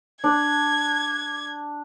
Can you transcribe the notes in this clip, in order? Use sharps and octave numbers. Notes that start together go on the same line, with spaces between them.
D4 G#6